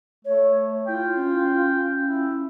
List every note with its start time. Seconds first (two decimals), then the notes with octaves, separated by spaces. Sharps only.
0.25 A3 C#5
0.88 E4 F4 G5
1.15 C#4
2.02 E4